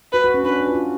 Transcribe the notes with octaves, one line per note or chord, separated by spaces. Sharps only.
F#4 B4
F#4
C#4
D4 B4
D4
F4
F#4